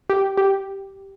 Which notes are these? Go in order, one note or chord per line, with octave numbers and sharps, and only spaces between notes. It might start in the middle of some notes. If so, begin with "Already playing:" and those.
G4
G4